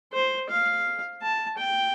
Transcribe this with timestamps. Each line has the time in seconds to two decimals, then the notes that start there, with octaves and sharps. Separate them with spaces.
0.13 C5
0.50 F5
1.22 A5
1.58 G5